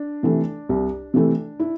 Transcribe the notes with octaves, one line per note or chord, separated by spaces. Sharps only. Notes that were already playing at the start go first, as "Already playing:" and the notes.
Already playing: D4
C3 E3 A3
C2
C3 E3 A3
E4